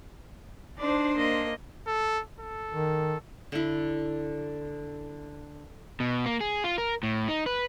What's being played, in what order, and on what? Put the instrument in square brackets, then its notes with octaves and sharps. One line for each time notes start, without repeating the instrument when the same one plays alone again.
[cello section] D4 C5 [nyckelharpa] D#4 D5
[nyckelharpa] A#3 D#5
[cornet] A4
A4
[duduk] D#3
[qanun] D3 E4
[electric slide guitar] B2
A#3
G#4
F4
A#4
A2
D#4
B4